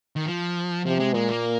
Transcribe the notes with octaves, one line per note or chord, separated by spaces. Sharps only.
D#3
F3
C3 F3
G#3
A#2 G#3
A#3